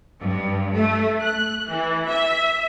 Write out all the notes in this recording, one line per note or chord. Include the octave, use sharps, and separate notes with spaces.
G2
A3
F#6
E3
E5